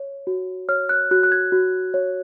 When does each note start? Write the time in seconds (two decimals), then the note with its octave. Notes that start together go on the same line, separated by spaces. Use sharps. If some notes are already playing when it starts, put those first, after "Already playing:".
Already playing: C#5
0.27 F#4
0.69 C#5 F6
0.89 F#6
1.11 F#4 F#6
1.23 F#6
1.32 G#6
1.52 F#4
1.94 C#5